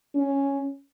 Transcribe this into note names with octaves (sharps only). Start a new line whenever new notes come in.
C#4